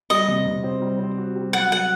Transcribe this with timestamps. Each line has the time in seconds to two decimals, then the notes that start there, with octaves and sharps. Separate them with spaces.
0.10 G3 D#5
0.28 C3
0.46 C3
0.64 C4
0.82 G3
0.99 C4
1.18 F#4
1.36 G3
1.53 F#3 F#5
1.72 F#3 F#5